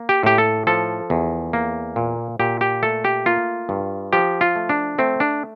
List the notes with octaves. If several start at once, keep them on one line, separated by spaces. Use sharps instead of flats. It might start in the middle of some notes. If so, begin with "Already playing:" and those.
Already playing: A#3
G4
A2 G4
A4
F3 A4
E2
A#3
A#2
A#2 G4
G4
A3 A4
G4
A#3 F4
G2
F3 G4
F4
A3
D4
A3 C4
D4